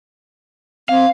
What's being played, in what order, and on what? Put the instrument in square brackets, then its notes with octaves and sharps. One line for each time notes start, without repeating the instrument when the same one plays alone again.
[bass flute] C4 [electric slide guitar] F5